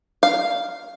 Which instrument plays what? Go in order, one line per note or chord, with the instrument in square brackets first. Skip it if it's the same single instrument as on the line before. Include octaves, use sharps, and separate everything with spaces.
[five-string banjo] F5